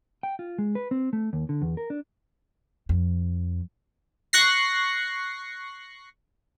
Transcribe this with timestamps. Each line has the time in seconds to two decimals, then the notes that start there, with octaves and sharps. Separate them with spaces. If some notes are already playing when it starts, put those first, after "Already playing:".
0.23 G5
0.39 F4
0.58 G#3
0.75 B4
0.91 C4
1.13 A3
1.33 D#2
1.49 D3
1.62 E2
1.77 A#4
1.90 D4
2.89 F2
4.33 C#6 F#6 A#6 C7